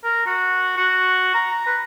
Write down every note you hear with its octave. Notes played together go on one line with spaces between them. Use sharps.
A#4
F#4
F#4
A#5
B4